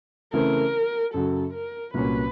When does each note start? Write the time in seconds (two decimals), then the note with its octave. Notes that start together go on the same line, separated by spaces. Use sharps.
0.33 C#3 E3 A3 C4 E4 A#4
1.14 F#2 C#3 F#3 A4
1.53 A#4
1.94 C2 A#2 F#3 A#3 C#4 B4